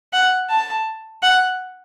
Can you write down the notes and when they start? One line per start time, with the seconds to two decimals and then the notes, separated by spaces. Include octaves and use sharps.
0.13 F#5
0.50 A5
1.22 F#5